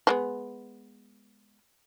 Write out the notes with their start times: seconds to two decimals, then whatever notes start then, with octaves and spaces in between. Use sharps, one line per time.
0.07 F3 G#3 B3